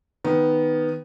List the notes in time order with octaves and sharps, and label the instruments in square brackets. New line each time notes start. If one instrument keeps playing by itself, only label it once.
[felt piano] D#3 B3